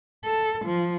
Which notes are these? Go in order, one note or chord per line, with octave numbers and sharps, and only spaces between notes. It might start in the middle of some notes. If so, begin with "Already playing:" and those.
A4
F3